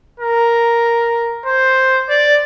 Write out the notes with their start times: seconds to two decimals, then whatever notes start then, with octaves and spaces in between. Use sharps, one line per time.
0.20 A#4
1.46 C5
2.09 D5